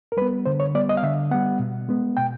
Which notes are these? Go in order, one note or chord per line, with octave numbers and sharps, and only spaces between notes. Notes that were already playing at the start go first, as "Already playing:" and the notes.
A#4
G3 B3 B4
D3 C5
C#5
G3 B3 D5
D#5
F5
D3 E5
G3 B3 F#5
B2
G#3 B3
B2 G5